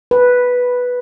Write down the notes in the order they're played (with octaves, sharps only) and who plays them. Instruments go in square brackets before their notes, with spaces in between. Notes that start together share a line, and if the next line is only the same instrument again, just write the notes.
[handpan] B4